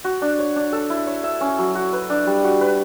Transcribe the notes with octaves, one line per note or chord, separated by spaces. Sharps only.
F#4
D4
C#5
D4
A4
E4
C#5
E5
C#4
F#3
F#4
B4
D4
G3
F#4
B4